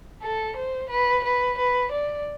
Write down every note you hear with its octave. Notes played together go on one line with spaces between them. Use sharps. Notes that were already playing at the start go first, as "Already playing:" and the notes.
A4
C5
B4
B4
B4
D5